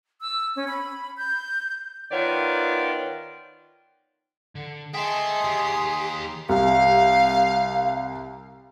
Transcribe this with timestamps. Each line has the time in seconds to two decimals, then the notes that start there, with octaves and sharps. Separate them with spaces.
0.21 E6
0.56 C#4
0.68 B5
1.17 G6
2.11 D#3 B3 F4 C#5 D5
4.55 D3
4.94 G#4 D#5 E5 G5 A5 C6
5.45 D#2 G4
6.49 C2 F5